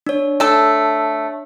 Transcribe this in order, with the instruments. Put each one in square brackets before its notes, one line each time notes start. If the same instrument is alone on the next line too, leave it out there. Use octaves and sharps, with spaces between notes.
[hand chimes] D4 C#5
[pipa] A3 A4